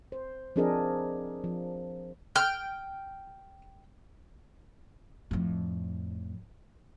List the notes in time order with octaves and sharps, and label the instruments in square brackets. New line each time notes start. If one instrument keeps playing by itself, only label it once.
[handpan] C5
F3 C4 D4 G#4 A#4 D#5
F3
[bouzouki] G5 [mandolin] F6
[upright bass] F2 A2